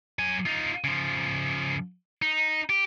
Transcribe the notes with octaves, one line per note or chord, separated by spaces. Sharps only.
F#3 G#5
D#4 F4
C#3 F3
D#4
G4